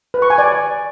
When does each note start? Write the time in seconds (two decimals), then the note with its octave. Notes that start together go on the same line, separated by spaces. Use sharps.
0.14 B4
0.22 C#6
0.30 G#5
0.38 D5